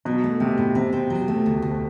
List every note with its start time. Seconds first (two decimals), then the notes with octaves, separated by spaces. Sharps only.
0.05 B2 F#3
0.24 A3
0.40 C3 A3
0.58 A2
0.75 C3 C4
0.93 C4
1.10 F#3
1.28 A3
1.46 D2
1.62 D2